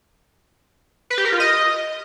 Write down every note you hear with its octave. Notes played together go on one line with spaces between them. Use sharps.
B4
G4
A#4
F4
D#5